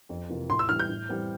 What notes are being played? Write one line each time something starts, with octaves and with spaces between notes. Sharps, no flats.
F2
C3 E3 A#3 F4
A2 C6
E6
E3 G3 F6
G6
A2
E3 G3 C4